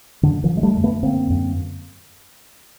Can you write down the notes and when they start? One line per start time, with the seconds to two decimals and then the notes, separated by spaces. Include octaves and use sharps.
0.23 F#2 D3
0.44 D#3 F3
0.50 D3
0.57 G#3
0.63 G3 A3
0.77 F#2
0.83 A3 B3
1.03 D3 A#3 C4
1.30 F#2